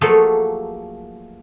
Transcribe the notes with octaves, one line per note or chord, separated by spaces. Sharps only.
F3 F#3 A3 A#3 G#4 A4